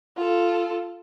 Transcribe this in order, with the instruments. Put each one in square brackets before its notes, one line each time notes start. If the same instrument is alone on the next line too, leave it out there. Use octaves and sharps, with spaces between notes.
[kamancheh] F4 A4